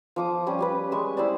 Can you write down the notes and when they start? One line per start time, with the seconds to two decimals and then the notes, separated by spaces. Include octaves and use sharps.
0.16 F3 D6 D#6
0.47 G3 C#4 G4
0.59 C#4 G4 B4
0.91 G3 G#3 C#6
1.17 E4 G4 C5 D5